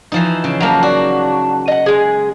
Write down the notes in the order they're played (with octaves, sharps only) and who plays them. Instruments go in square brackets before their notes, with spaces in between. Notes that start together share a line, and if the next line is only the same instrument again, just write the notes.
[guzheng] E3 F3 D#4
C#3
[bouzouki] F3 A#5 [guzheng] F#3 A#3
[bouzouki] D4 [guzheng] F#4
[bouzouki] D#5 F#5
G#3 G#4